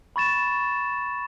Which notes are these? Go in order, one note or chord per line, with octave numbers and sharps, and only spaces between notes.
B5 C#6 A6 E7